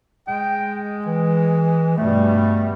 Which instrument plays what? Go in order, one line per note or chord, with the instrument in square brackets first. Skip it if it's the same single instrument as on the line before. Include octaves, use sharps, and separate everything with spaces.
[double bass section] G#3 [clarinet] G5
[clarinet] E3
[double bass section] G2 B2 G3 [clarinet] A3